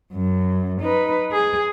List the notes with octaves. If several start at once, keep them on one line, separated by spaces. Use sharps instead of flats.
F#2
D#4 B4
G#4